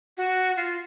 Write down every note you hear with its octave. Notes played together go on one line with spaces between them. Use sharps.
F#4
F4